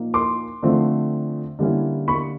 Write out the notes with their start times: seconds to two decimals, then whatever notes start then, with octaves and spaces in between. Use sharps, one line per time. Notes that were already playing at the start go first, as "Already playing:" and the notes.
Already playing: A#2 F3 A#3 D#4
0.14 C6 D6
0.63 D3 F3 A3 C4
1.59 D3 G3 A#3 C#4 E4
2.08 B5 C#6